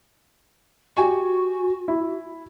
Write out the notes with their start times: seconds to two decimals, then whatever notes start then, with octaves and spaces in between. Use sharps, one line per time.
0.97 F#4 G4 G#5 C#6
1.88 E4